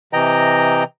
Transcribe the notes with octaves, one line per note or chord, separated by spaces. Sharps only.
C3 E3 D#5 G5 A#5